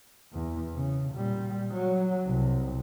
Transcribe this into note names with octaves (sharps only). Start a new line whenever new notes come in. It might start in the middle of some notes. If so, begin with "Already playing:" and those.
E2
C#3
A#2 G3
F#3
C2